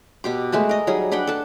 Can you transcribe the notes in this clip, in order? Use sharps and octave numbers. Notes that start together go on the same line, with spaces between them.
B2 G4 D6
G#3 A3 B4 A5
A#4 D#5
F#3 G3 D#4 G#4
D4 B4 F#5 G5
A4 A5